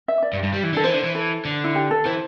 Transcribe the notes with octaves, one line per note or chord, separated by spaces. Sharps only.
E5
D5
G2
G2
G3
E3
D3 A4
E3 C5
D3
E3
A4
D3
E4
G4
A4
E3 C5